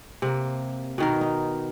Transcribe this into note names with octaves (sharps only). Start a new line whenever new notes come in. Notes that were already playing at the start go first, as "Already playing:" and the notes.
C3 A#3
B2 D#3 A#4
D#4